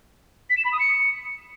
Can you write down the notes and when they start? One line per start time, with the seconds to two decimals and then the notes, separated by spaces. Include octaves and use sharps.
0.50 B6
0.57 E7
0.65 B5
0.72 D#6
0.80 C#7